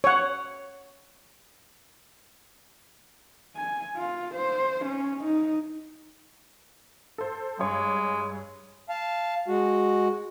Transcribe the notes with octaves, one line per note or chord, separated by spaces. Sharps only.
C#5 F#5
G#5
F4
C5
C#4
D#4
A4 C5
G2 G#3 C#5
F5 A5
G#3 F#4